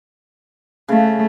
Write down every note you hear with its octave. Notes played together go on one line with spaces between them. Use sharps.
C#3 A3